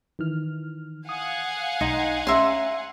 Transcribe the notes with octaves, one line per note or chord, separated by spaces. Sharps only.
D#3 E3 F6
F5 F#5 G#5 D#6
B1 D#4 D#5 C6
C#4 E5 A#5 C6